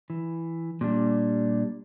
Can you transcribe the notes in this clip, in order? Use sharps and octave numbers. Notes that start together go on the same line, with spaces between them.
E3
A#2 G3 D4